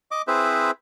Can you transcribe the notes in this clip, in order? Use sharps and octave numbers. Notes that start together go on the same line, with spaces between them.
D#5 D6
C4 E4 G#4 B4 C5 E5